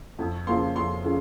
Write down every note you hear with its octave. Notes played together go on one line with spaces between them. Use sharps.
F2
C#3 F3 A#3 C6
F2 C6
C#3 F3